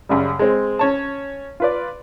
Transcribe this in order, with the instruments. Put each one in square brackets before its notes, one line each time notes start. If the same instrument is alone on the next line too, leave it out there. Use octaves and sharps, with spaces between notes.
[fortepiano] F#2 C#3 G3
G#3 C4
C#4 C#5 A5
F4 B4 D5